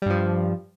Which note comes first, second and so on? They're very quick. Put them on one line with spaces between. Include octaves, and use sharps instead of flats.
G3 G2 F3